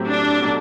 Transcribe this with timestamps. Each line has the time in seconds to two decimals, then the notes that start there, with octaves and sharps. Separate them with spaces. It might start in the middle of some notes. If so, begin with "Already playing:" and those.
Already playing: A2 F#3 C4 G4
0.09 D4
0.42 B2 F#3 A3